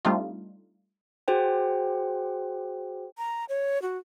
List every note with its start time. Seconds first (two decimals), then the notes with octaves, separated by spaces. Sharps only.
0.05 G3 A3 C4 D4 D#4 F4
1.28 F#4 G#4 C5 G5
3.18 A#5
3.49 C#5
3.82 F#4